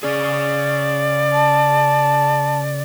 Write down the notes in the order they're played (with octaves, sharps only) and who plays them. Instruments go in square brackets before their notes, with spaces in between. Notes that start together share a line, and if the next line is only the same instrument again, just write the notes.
[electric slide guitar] C#3 C#4 G#4 [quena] D5
[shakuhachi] A5